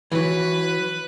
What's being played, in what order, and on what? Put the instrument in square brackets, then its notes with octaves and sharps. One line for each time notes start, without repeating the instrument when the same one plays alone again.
[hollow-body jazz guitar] E3 F#3 [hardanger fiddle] B4